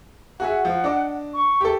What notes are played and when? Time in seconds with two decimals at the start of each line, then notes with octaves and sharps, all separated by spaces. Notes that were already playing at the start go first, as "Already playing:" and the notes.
0.40 F#4 G#4 E5 F#5
0.65 F3
0.84 D4 D#5 D6
1.34 C#6
1.61 G4 A4